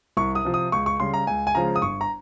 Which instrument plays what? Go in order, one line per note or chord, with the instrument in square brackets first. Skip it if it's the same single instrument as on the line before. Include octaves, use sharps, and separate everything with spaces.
[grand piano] C2 C#6
D#6
C3 F3
D#6
C#2 C#6
C#6
C#3 G3 C6
A#5
C#2 G#5
G#5
C#3 F3 G#3 A#5
D#6
G1 C#6
A#5